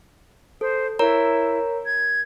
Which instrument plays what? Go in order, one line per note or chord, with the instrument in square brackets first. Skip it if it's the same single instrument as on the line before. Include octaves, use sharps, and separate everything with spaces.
[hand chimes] A4 [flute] C5
[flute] E4 [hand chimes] A#4 C#5 A#5
[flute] G#6